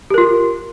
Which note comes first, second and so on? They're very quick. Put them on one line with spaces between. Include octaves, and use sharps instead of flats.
G4 A#4 F4